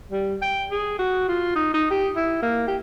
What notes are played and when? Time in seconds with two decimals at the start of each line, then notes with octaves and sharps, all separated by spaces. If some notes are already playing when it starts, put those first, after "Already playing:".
0.12 G3
0.42 G5
0.71 G#4
0.99 F#4
1.28 F4
1.56 D#4
1.74 D#4
1.91 G4
2.16 E4
2.43 A#3
2.68 G4